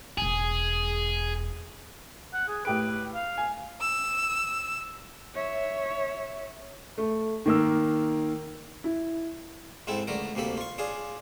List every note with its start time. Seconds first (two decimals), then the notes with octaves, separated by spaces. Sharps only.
0.18 E1 A2 G#4
2.33 F#5
2.48 G#4
2.65 A2 G4 B4 D7
3.14 F5
3.38 G#5
3.80 E6
5.34 C#5 E5
6.98 A3
7.46 D#3 A#3 E6
8.84 E4
9.87 G#2 C4 E4 A4
10.07 C#2 D3 A3 A#4
10.35 D2 C3 A#3 A4 B5
10.57 F4 C#6
10.78 D4 F4 G#4 C#5